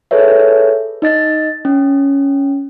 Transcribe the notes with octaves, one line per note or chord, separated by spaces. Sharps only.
G#4 A4 B4 C#5 E5
D#4 D#5 A6
C#4